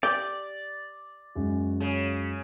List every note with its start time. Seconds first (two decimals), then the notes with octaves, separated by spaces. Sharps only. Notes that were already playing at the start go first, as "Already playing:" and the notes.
0.03 G4 D5
1.35 F#2 G#3 F#4
1.80 C#3